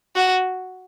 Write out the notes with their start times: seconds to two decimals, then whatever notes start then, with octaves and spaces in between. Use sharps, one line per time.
0.16 F#4